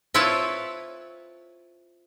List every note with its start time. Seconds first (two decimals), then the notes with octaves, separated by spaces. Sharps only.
0.14 C4 E4 F4 A4 B4 C#5